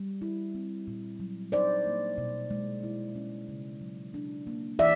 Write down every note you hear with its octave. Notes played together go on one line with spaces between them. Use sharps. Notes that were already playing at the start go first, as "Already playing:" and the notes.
Already playing: G3
E4
C4
A#2
F#3
D#4 C5 D5
A#3
B2
G#3
E4
C#4
C#3
F#3
D4
A#3
E3 D5 E5